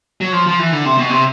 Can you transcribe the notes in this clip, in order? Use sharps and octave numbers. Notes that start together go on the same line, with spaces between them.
F#3
F3
F3
E3
D3
C3
B2
C3